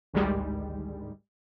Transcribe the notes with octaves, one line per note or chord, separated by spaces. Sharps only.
A1 D2 G#2 D#3 G3 G#3